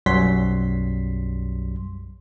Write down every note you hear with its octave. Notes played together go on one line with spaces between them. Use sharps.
B1 F#2 F#3 G3 C6 B6